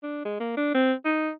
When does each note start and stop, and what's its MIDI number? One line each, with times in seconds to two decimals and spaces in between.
0.03 0.24 62
0.25 0.38 56
0.40 0.54 58
0.57 0.73 62
0.74 0.93 60
1.05 1.31 63